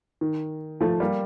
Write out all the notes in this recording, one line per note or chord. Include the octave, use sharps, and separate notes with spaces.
D#3
F3 A3
G3 A#3